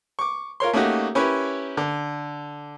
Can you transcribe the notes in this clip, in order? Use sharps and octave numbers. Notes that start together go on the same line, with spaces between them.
C#6 D6
F4 A#4 C#5 C6
A3 A#3 C#4 D#4 F#4 G4
C#4 E4 G4 A#4 B4 C#5
D3